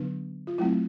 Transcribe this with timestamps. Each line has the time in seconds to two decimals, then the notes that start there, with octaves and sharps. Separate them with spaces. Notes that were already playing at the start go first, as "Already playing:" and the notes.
Already playing: D3 F#3 B3 D4
0.47 F4
0.58 F#3 A3 C4 E4